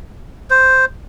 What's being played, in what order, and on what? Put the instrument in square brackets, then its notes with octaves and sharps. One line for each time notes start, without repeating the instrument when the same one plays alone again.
[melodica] C5